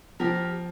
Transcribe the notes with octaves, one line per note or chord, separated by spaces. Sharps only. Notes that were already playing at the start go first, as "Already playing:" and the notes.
F3 G4 A#4